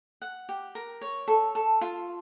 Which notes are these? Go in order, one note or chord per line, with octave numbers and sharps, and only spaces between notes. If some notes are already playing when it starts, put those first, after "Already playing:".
F#5
G4
A#4
C#5
A4
A4
F4